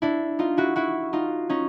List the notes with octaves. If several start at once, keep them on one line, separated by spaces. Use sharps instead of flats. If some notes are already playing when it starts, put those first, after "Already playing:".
D4 E4
D#4 F4
E4 F#4
E4 F#4
D#4 F4
C#4 D#4